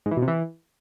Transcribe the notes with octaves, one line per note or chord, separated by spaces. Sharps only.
G#2
E3
B2
C3
E3